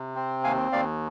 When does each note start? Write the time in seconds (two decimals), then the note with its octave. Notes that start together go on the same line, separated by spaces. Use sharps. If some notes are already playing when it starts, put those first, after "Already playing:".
Already playing: C3
0.15 C4
0.44 D#2 F5 G#5
0.72 D#2 D5 F5